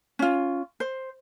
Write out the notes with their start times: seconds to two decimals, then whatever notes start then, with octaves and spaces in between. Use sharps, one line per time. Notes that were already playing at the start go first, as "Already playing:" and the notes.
0.19 C#4 F4
0.80 C5